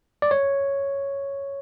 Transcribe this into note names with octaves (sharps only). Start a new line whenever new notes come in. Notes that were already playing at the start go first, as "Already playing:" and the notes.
D5
C#5